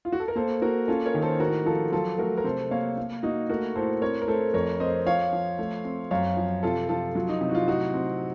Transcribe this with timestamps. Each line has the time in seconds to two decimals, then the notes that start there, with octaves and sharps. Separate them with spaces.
0.05 F4
0.12 F#4
0.20 A4
0.28 A#4
0.35 A#3 A4 C5
0.62 A#3 F#4 A#4
0.88 C#4 F4 A4
1.06 A#4 C#5
1.14 D#3
1.22 A4 C5
1.40 A2 F#4 A#4
1.66 F3 F4 A4
1.92 F#3 F4 A4
2.18 A3 F#4 A#4
2.37 A#4
2.44 C3 A4 C5
2.71 A#3 C#5 F5
2.97 A#3
3.23 A#3 D#4 F#4
3.49 A3 F#4 A#4
3.75 A2 A4 C5
4.02 C4 A#4 C#5
4.22 A#4
4.28 A3 A4 C5
4.54 F2 A#4 C#5
4.80 C4 C5 D#5
5.06 F3 C#5 F5
5.33 F3
5.59 A3
5.84 C4
6.11 F#2 C#5 F5
6.37 F3
6.63 C3 F4 A4
6.89 F3 F4 A4
7.15 F#3 F4
7.29 D#4
7.41 C3 D#4
7.49 F#4
7.55 F4
7.68 A2 D#4 F#4
7.93 C4